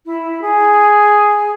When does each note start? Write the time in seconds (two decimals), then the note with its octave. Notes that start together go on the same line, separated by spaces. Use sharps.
0.06 E4
0.41 G#4